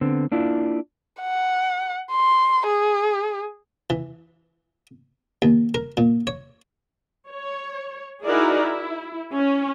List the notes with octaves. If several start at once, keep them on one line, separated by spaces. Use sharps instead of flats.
D3 B3 C4
A#3 D4 E4 F4
F#5
C6
G#4
E3
D#2
A#4
A#2
C#5
C#5
D#4 E4 F#4 G#4 A#4 D5
E4
C#4